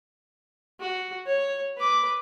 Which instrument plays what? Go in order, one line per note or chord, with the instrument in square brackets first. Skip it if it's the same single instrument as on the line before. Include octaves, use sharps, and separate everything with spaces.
[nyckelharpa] F#4
C#5
B4 D6